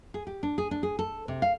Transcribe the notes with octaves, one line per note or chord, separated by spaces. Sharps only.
G#4
G4
D4
G#4
D4
G#4
A4
C3
F5